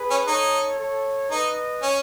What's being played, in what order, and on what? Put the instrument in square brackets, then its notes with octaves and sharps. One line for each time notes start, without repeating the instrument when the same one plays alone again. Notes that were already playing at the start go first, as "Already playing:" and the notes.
Already playing: [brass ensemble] G#4 B4
[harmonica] C#4
[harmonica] D#4 [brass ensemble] A4 C#5
[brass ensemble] A4 C#5
[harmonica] D#4 [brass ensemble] B4 D#5
[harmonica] C#4